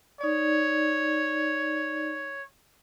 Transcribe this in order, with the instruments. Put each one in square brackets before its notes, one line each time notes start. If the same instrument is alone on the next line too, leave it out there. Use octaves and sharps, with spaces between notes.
[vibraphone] D#4 D5 [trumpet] C#5